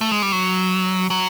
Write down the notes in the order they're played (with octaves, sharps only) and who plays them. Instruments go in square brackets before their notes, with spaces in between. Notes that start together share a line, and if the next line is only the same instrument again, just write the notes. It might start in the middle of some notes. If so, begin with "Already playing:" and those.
[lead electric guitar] A3
G#3
G3
F#3
F#3